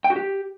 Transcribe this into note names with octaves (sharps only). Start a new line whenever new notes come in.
G5
F#4
G4